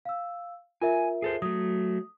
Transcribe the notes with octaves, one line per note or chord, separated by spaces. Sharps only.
F5 E6
F4 A#4 E5 G#5
G#4 A4 C5
F#3 A3 D#6